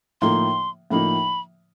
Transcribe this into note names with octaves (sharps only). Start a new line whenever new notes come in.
A2 F3 A#3 D#4 C6
A2 F3 A#3 D#4 B5